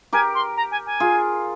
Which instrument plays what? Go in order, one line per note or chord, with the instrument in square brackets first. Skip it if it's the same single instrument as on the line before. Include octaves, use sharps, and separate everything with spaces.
[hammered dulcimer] G4 A#4 [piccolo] G#5
[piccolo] C6
A#5
G#5
G#5
[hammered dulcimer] F4 G#4